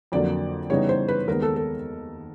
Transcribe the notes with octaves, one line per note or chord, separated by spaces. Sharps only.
F2 D3 F#3 A#3 D5
C#3 E3 G3 B3 D#4 C#5
C5
B4
D#2 D#3 G#3 B3 A#4
A4
A4